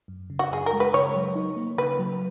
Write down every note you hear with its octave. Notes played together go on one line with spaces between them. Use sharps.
F#2
C#3
F#4
F#2 G#4
A#4
G#3
B4
C#3 C#5
F#3
D#4
A#3
C#3 B4
F#3